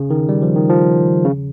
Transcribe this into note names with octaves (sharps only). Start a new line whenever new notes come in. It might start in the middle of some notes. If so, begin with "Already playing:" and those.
Already playing: C#3
D#3
G3
F3
D#3
F3
C#3